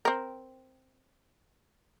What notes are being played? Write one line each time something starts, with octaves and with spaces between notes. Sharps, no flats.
C4 A#4